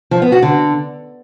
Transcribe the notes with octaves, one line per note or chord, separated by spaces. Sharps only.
F3
B3
F#4
D3